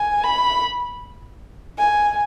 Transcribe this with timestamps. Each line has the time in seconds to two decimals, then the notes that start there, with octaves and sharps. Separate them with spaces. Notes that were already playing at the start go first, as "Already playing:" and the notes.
Already playing: G#5
0.24 B5
1.78 G#5